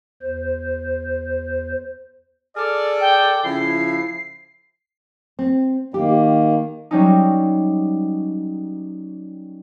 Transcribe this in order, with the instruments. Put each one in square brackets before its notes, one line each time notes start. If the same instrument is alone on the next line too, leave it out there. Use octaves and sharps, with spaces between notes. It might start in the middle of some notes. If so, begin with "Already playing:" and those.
[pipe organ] E2 C5
[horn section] G#4 A4 D5 [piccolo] F6
[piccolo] G5
[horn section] C#3 F3 E4 [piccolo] C7
[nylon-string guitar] C4
[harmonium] D#3 A#3 [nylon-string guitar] G4
[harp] F#3 G3 C#4 D#4